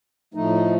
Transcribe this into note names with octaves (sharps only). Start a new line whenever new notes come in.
A2 F3 A3 D#4